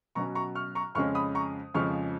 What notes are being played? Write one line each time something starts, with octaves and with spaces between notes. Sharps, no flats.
B2 F#3 C#4 A#5 C#6
A#5 C#6
C#6 F6
A#5 C#6
F2 C#3 G#3 C#4 C#6 F6
B5 D#6
A#5 C#6
F2 C#3 F3 G#3 C#6 F6